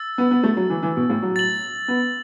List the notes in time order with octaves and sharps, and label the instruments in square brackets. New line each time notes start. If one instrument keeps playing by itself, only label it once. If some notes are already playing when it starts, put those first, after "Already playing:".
Already playing: [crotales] E6 A6
[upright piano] B3
B3
A3
F#3
E3
E3
B2
A2
F#3
[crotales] A6 F#7
[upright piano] B3